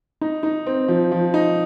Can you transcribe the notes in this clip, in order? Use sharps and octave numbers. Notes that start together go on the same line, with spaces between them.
D#4
D#4
C4
F3
F3
D#4